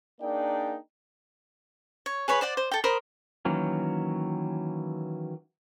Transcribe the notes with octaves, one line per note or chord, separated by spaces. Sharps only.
A#3 D4 D#4 G#4 D5 G5
C#5
G#4 B4 C#5 B5
C5 D5 F#5
C5
A4 G5
A#4 C5 B5 D#6
D#3 E3 F#3 A#3 C#4